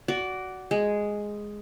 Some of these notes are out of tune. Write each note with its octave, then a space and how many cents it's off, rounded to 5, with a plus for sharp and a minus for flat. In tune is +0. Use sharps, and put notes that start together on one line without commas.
F#4 +10 D5 -15
G#3 +0 G#4 +0